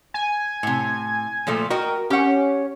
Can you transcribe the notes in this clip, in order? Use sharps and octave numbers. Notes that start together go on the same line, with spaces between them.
G#5
A2 C3
A#2 F3 A3
F#4 A#4 D#5 G5
C#4 G4 F#5